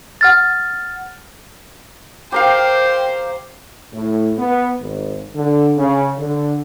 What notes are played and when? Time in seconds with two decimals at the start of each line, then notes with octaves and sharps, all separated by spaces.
0.21 F#5 F6 A6
2.32 G4 A#4 C5 F5 G5
3.94 A2
4.38 B3
4.80 G#1
5.34 D3
5.77 C#3
6.17 D3